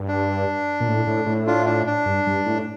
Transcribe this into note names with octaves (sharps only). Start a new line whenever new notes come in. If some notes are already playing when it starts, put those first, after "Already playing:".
Already playing: G2
D4
A#2
A2
A2
A2
D4 F4
D4
D4
G2
G2
A2